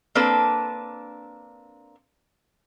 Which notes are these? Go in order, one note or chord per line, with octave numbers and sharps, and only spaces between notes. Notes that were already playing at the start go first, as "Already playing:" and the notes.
A#3 C4 D4 A4 B4